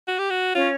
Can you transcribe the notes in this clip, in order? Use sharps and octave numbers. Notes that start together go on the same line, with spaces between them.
F#4
G4
F#4
C#4 F4 C#5